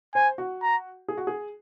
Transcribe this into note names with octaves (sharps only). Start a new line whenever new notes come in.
C5 G#5
F#4
A#5
G#4
F#4
G#4